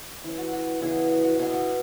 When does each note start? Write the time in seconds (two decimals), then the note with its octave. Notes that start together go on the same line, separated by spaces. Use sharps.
0.24 E3 C#4 E4
0.38 F#4
0.53 F#4 B4
0.81 C#3 E3 B3 E4 G#4
1.10 F#4
1.25 F#4
1.39 B2 B3 E4 G#4
1.53 F#4 B4